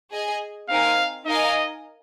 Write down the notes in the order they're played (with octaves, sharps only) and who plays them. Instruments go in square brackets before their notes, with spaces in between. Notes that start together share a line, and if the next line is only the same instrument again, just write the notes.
[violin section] G#4 D#5 G#5
[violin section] C4 D#4 A#4 G#5 [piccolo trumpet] F5
[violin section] D#4 A#4 F5 G#5 [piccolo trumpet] D#5